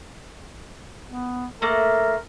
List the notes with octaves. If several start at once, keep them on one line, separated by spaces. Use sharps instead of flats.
B3
A3 A#3 A#4